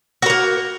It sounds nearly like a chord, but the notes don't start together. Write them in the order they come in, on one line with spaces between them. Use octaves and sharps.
F#4 A#4 A#3